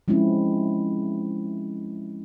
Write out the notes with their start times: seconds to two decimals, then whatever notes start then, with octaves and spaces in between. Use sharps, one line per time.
0.08 F3 G#3 C4 C#4 E4